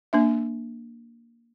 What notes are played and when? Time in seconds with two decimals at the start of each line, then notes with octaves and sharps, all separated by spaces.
0.13 A#3 D4 E5